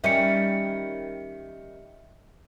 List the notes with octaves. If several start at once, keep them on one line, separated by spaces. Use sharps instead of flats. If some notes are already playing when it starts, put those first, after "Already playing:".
D#3 G3 C#4 E5 C#7